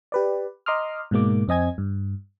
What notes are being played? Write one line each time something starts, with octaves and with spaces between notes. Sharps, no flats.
G4 B4 D5
D#5 A#5 C6 D6 D#6 F6
G#2 B2 G#3 A#3 D6
F2 C4 D#5 G#5 G#6
G2